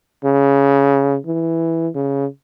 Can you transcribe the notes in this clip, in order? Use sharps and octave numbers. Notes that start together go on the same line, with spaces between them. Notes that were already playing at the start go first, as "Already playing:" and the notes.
C#3
E3
C#3